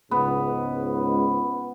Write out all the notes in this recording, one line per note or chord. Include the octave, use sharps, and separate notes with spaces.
C#2 G#2 B3